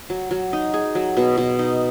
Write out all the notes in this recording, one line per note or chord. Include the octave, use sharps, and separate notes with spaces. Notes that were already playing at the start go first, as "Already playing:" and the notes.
F#3
F#3
D#4
G#4
F#3
B2
B2
D#4